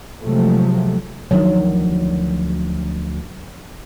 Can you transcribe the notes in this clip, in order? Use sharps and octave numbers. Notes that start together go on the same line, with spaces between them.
C3 F3 F#3 G#3 A3
D2 D#3 F3 F#3 D4